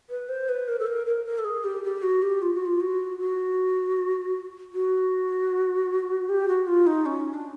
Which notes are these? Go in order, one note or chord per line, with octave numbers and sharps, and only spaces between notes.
B4
C5
B4
A#4
A4
A#4
A#4
A#4
A4
G#4
G4
G4
F#4
G4
F4
F#4
F4
F#4
F#4
F#4
G4
F#4
F4
D#4
C#4
D4